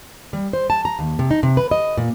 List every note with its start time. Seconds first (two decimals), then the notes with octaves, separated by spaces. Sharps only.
0.33 G3
0.53 C5
0.70 A5
0.85 A#5
0.99 D#2
1.19 C3
1.31 D#4
1.43 C3
1.57 B4
1.71 D#5
1.98 A#2